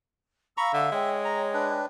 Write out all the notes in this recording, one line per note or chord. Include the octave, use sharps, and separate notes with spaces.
F5 A#5 B5 C#6 E6
D3 E5
G#3 C#5 G5
A#5
D4 B4